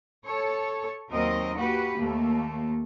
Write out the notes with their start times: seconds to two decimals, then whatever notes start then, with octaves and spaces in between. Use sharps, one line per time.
0.24 A4 C#5
1.11 D#2 F#3 C4 A#4 D#5
1.57 A#3 F#4 G4 B4
1.97 D#2 A3 A#3